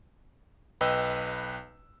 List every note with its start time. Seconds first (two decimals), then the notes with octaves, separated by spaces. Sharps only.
0.81 B1 B4 D#5 G5 E6